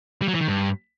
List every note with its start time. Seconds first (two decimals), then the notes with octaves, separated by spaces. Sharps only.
0.22 G3
0.28 F#3
0.35 E3
0.41 D#3
0.47 G2